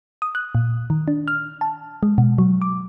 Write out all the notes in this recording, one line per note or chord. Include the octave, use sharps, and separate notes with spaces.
D#6
F#6
A#2
D#3
D4
F6
A5
G#3
B2
F#3
D6